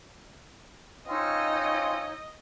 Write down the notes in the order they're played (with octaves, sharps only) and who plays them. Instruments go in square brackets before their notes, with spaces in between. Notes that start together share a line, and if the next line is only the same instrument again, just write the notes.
[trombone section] C4 C#4 F4 [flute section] D#4 C#5 E6 [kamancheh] D#5